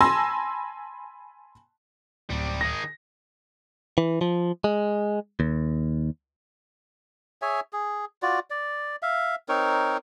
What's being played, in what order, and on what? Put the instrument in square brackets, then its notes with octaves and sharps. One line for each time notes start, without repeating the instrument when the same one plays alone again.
[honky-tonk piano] G#5 A5 B5 C6 E6 A#6
[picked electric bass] D1 [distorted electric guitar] C3 G3
[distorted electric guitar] D#3 G#4 [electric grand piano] A#6
[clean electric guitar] E3
F3
G#3
D#2
[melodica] G#4 C#5 E5 G#5
G#4
F4 F#4 D5
D5
E5 F5
C4 D#4 A#4 C#5